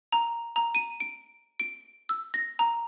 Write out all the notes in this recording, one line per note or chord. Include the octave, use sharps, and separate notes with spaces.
A#5
A#5
D#7
D7
D7
E6
A#6
A#5